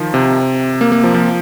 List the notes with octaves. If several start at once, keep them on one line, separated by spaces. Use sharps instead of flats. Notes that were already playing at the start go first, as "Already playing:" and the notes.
Already playing: D#3 F3
C3
A#3
A#3
F3
F3